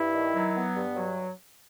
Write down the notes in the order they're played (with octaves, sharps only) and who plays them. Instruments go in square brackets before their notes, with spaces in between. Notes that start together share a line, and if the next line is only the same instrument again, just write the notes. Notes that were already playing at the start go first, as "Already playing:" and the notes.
Already playing: [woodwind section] G2 [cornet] E4
[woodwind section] D#3
F#3
B3
G2
F#3